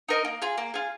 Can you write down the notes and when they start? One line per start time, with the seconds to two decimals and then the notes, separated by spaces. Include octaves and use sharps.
0.08 D#4 A#4 D#5
0.25 A#3
0.42 F4 G#4
0.58 A#3
0.74 F4 G#4